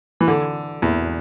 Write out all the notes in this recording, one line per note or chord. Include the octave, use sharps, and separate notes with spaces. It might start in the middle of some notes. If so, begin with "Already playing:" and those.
E3
D3
E2